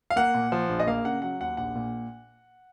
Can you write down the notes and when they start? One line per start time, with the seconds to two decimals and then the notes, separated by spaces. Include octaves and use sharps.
0.10 F5
0.16 A#3 F#5
0.34 A#2
0.52 F3
0.69 A#1
0.80 D#5
0.87 A#3 F5
1.05 C#3 F#5
1.22 F#3 F#5
1.40 D#2 F#5
1.57 A#1 F#5
1.75 A#2